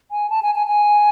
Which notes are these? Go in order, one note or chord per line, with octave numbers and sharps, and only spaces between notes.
G#5
A5
G#5
G#5
G#5